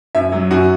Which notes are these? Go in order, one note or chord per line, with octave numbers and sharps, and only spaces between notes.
F#2 E5
F#3
F#2 F#4